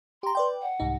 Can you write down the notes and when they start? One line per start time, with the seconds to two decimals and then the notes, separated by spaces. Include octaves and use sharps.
0.23 G4 A#5 C6
0.35 B4 D5 G5
0.62 F#5
0.80 C2 G#2 D#4